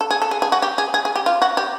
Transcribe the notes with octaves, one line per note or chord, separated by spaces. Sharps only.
A4
G#4
A4
G#4
G#4
F#4
G4
G#4
G#4
G#4
G4
F4
F#4
G4